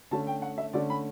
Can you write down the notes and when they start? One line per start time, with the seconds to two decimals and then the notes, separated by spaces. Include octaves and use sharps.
0.11 D3 A3 C#4 A5
0.27 G5
0.42 F#5
0.58 E5
0.73 D3 A3 C#4 D5
0.90 B5